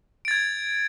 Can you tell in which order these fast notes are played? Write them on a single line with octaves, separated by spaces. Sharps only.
D7 A6 G#6